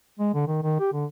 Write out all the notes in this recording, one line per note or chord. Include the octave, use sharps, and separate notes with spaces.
G#3
D3
D#3
D#3
G4
D3